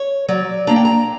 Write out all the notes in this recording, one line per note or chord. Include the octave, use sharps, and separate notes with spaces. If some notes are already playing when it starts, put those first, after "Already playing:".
Already playing: C#5
F#3 D5
A#3 D4 A#5
G5
A#5